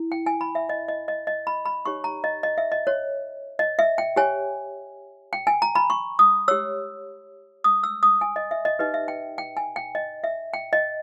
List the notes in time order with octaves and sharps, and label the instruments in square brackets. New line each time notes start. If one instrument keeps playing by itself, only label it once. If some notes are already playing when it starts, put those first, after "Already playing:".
Already playing: [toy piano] E4
G5
G#5
B5
E5
D#5
D#5
D#5
D#5
B5
B5
D#4 G4 C#5 C#6
A#5
D#5
D#5
E5
D#5
C#5
D#5
E5
G5
G4 C#5 G#5
G5
G#5
A#5
B5
C#6
D#6
G4 C#5 E6
D#6
E6
D#6
G#5
D#5
E5
D#5
D#4 G4 B4 D#5
E5
G5
G5
G#5
G5
D#5
E5
G5
D#5